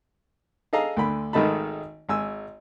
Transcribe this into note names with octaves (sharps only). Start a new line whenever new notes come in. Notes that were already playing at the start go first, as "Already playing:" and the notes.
G#4 A4 D#5 F5 A#5
D2 D3 B5
G#1 D#3 A3 D#4 A5 B5
G#1 G#5 E6